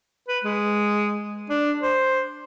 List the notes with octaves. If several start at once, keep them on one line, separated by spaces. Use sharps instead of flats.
B4
G#3
D4
C5